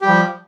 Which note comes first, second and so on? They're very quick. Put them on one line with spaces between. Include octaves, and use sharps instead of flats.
G4 G3 F3